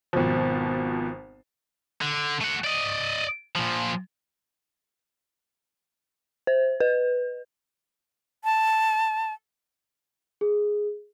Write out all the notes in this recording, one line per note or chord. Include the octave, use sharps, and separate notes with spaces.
G#1 B2 F3
D3
A3 F#5
D5 D#5
A#2 F3
C5
B4
A5
G#4